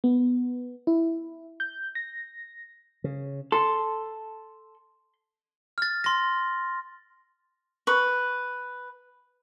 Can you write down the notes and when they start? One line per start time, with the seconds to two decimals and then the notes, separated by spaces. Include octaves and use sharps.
0.04 B3
0.87 E4
1.60 G6
1.95 A#6
3.04 C#3
3.52 A4 C6
5.78 F6 A6
6.04 C6 A#6
7.87 B4 C#6